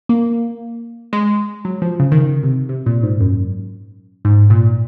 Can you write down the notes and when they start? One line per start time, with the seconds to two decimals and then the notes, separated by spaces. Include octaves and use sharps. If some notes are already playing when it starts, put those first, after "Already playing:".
0.09 A#3
1.13 G#3
1.65 F#3
1.82 F3
2.00 C#3
2.12 D#3
2.17 C#3
2.43 C3
2.69 C3
2.86 A#2
3.03 G#2
3.20 F#2
4.25 G#2
4.50 A#2